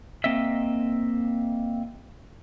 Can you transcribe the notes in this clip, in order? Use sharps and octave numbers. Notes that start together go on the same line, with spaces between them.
A#3 C4 D#5 E5